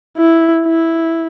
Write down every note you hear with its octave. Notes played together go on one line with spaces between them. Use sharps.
E4
E4